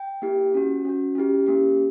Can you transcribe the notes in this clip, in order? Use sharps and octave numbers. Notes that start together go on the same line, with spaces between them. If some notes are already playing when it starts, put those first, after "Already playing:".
Already playing: G5
A#3 E4 G4
C#4 F#4
C#4 F#4
C#4 E4 G4
A#3 C#4 G4